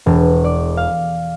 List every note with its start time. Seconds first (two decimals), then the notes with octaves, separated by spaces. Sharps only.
0.06 E1
0.44 D5
0.77 F5